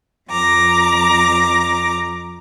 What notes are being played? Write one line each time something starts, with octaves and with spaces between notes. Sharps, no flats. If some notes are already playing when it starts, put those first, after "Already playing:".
F2 A#5 D6